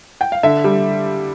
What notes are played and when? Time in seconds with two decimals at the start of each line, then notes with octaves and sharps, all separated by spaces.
0.21 G5
0.32 F5
0.43 D3 E5
0.64 G3